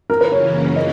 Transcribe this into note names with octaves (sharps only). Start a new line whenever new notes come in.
F#2 C#3 E3 A#3 C#4 A#4
B4
C#5
D#5